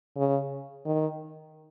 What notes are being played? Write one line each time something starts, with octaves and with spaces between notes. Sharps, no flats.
C#3
D#3